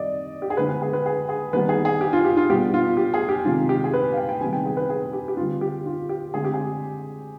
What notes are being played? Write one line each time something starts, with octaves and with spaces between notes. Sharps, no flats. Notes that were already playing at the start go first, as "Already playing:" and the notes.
Already playing: D#3 G3 C4 D5 D#5
G4
G#4
D3 G#3 B3 B4
B4
G#4
B4
G#4
G#4
D#3 G3 B3 B4
G#4
G#4
G4
F4
G4
F4
B2 G3 B3 G4
F4
G4
G#4
G4
C3 D#3 G#3 F4
G4
G#4
B4
F5
G5
G5
C3 D#3 G3 B3 G#5
G5
G#4
B4
G#4
G4
G4
D3 G3 C4 F4
G4
F4
G4
D3 G#3 C4 G#4
G4
G#4